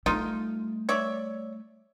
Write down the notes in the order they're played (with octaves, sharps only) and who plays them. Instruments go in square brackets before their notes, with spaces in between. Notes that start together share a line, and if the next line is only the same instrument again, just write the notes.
[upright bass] G3 A3 [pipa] D#4 F4
[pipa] C#5 D5 E5